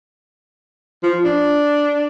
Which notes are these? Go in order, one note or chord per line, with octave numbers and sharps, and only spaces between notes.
F3
D4